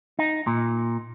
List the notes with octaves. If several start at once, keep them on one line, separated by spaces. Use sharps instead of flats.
D#4
A#2